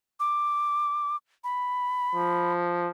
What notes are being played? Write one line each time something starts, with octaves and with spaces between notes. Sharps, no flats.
D6
B5
F3